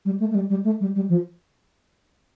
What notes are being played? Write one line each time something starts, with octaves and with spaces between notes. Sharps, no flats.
G3
A3
A3
G3
G3
A3
G3
G3
F3